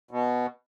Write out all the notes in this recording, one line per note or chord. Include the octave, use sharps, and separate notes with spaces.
B2